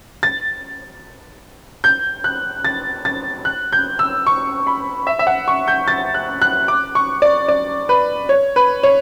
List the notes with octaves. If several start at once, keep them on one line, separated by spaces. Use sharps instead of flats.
A6
G6
F#6
A6
A6
F#6
G6
E6
C#6
B5
E5
E5
F#5
C#6
G6
A6
F#6
F#6
D6
C#6
D5
D5
B4
C#5
B4
C#5